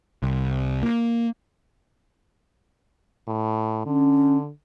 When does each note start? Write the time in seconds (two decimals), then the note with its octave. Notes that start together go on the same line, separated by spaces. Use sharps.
0.23 C2
0.83 A#3
3.28 A2
3.86 D3 C#4